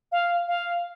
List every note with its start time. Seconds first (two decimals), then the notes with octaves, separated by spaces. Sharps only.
0.12 F5
0.48 F5